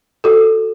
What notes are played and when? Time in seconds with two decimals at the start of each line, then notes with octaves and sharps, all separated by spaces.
0.24 F#4 A4